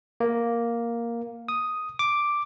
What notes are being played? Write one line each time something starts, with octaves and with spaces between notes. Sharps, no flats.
A#3
D#6
D6